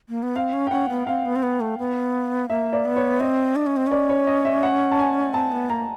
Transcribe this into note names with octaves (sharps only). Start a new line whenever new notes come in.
A#3
B3
C4 F5
C#4
G5
C#4 F#5
B3
C4 F5
B3
C4
B3
A3
B3
A#3 E5
D5
B3
C#5
C4 D#5
D4
C#4
C4
C#4 D5
C#5
D#5
E5
F#5
A5
G#5
C4 A5
B3
A#3 A#5